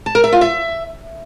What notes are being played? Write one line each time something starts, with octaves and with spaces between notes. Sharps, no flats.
A5
A#4
E5
F4
E5